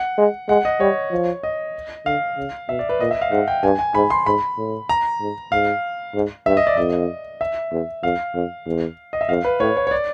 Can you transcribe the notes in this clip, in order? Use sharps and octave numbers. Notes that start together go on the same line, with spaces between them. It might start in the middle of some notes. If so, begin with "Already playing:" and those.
Already playing: F#5
G#3
G#3 F#5
D#5
G3 C#5
F3
D#5
D3 F5
C#3
B2 E5
D5
B4
A#2 D#5
E5
F5
G#2 F#5
G5
G2 G#5
G#5
G#2 B5
C6
G#2 B5
A2
A#5
G#2
G#2 F5
G#2
G2 E5
D#5
D5
F2 D#5
E5
E2
F2 F5
F2
E2
D#5
E5
F2 F5
B4
A2 C#5
C#5
C#5
D5